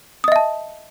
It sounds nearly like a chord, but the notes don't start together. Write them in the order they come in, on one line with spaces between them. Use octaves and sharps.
D#6 D#5 E5 A5